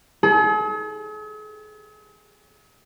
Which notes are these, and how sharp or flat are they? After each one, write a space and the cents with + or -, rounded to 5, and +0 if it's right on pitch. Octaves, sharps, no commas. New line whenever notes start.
G#4 +45